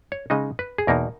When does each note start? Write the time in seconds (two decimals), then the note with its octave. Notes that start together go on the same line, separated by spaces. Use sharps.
0.12 C#5
0.30 C#3 G#3 D#4 D#5
0.59 B4
0.78 G#4
0.87 E2 B2 A#3 D#4 A#4